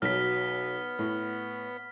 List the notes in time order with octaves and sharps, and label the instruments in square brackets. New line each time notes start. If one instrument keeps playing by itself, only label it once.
[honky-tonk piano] B1 F#3 [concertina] B3 [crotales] F6 B6
[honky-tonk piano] A2